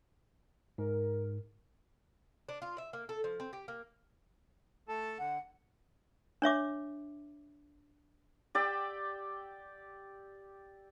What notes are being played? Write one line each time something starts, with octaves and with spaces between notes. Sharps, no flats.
G#2 A#4
D4
F4
E5
A#3
A4
F3
C4
G4
A#3
A3 A4 A5
D3 F#5
D4 C#5 E5 D6
G4 D5 G5 E6